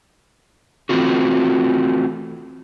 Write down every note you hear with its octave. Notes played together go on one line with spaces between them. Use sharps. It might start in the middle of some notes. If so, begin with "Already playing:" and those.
E3 F3 A3 C4 F4 F#4